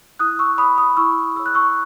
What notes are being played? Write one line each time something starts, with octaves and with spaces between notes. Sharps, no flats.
E4 D#6 F#6
C#6 E6
G#4 C#5 B5 D#6
B5 D#6
E4 C#6 E6
G#4 C#5 E6
F#6
C#6 E6